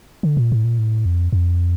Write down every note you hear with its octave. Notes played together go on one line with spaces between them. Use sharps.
D3
A#2
A2
A#2
A2
F2
F2